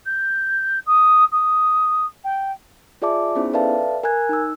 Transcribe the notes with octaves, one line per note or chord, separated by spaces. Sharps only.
G6
D#6
D#6
G5
F4 G#4 D5 E5 A5 D6
B3 C#4 D#4 E4 G#4 C5
A4 B4 D5 E5 F5 A5
A#4 G#5 A#5 F#6 G#6
D#4 E6